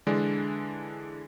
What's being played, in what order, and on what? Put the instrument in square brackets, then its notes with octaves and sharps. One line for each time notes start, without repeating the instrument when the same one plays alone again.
[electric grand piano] D3 E3 G#3 D4